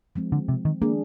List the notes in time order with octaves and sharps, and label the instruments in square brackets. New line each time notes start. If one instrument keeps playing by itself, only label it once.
[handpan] F3 G#3 C4
[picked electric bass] D3
C3
D#3
[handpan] D#3 G#3 D4 G#4 [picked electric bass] A#3